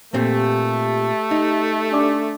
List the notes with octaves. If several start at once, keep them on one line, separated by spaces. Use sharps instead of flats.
A#2 A3 C4 G4
D#4
D4 D5 D6